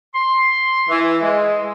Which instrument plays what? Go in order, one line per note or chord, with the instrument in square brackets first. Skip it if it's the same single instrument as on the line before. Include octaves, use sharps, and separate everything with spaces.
[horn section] C6
E3
G#3